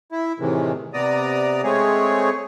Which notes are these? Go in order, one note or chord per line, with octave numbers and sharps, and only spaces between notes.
E4
A2 C3 D#3 E3 G#3
C3 B3 D5 A#5 D#6
G#3 A3 C4 G#4 C#5